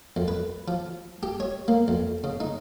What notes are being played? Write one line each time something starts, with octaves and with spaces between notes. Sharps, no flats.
F2
B4
F3
G4
C#5
A#3
F2
C#3
D#4